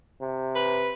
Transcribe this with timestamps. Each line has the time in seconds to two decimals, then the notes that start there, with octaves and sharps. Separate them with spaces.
0.21 C3
0.55 B4